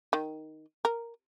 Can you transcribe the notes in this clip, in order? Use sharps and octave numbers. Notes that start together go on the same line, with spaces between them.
D#3
A#4